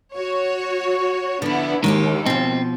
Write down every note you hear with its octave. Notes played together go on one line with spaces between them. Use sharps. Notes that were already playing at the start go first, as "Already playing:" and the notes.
F#4 C#5
D3 F3 B3 D4 E4
D#2 D#3 G#3 A#3 G4
B2 F3 C4